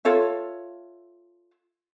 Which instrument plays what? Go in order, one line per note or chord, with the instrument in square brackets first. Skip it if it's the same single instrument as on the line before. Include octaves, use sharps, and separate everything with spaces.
[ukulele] F4 A4 C#5 E5